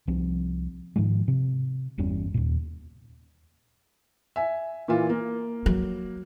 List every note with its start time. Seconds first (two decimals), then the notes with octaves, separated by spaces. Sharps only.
0.07 C2 F3 C4
0.96 G#2 D#3 F3 G#3
1.28 C3
1.98 G1 E2 G3 C#4
2.34 D#2 A#2
4.36 E5 G#5
4.88 A#2 E3 F4
5.10 A#3
5.66 F#3